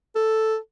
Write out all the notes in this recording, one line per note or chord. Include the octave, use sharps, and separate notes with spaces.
A4